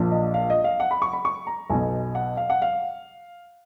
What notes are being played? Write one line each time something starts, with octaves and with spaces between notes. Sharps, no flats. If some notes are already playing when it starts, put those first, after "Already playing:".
Already playing: A#1 A#2 F3
D#5
F5
D#5
F5
F#5
B5
C#6
B5
C#6
A#5
B1 B2 G#5
F#5
F5
F#5
F5